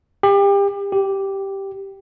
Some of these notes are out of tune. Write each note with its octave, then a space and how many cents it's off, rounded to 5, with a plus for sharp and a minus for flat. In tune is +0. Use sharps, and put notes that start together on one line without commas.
G4 +30
G4 -5